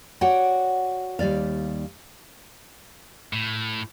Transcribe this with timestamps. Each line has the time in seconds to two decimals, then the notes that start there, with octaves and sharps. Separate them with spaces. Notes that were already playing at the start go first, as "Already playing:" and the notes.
0.21 F#4 C#5 D5 F#5 G5
1.19 D#2 G3 D5 F5
3.33 A2